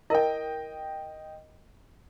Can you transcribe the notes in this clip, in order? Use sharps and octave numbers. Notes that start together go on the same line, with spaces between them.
E4 A#4 D#5 G5